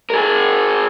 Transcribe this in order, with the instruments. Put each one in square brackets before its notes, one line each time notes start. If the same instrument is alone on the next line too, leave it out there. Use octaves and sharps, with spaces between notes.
[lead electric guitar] G#4 A#4